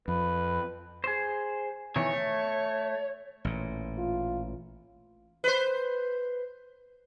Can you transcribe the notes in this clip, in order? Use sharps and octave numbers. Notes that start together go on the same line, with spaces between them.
F2 B4
G#4 C5
B2 D#3 E3 C#5
A3
A1 A#2
F4
B4 C5